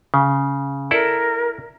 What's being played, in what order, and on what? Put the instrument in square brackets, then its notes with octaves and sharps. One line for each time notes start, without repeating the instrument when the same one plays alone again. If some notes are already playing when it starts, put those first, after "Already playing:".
[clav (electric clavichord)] C#3
[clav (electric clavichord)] E4 A4 D5 [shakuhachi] A#4